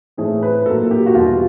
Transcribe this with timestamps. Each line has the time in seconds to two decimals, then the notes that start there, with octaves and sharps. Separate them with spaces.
0.17 A2 E3 A3 C4 G#4
0.43 B4
0.66 A#2 F#3 A#3 A4
0.91 G4
1.06 F#4
1.15 E2 B2 G3 F4